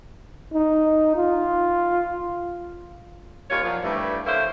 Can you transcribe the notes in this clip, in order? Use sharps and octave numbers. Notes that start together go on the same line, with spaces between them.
D#4
F4
D#2 G3 F4 C#5
F#2 A#2 F3
G2 E3 G3 A3
D3 A#3 C5 C#5 E5